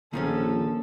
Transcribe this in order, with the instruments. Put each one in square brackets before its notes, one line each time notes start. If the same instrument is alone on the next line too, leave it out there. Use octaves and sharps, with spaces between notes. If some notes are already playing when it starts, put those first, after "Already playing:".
[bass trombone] A#1 [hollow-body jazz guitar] D#3 F3 C#4 [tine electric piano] A#3 [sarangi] A4